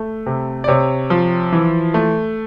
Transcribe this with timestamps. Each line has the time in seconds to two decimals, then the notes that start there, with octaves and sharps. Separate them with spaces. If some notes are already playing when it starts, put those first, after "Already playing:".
Already playing: A3
0.26 C3
0.64 D5
0.68 C3 C#5
1.10 F3
1.53 E3
1.94 A3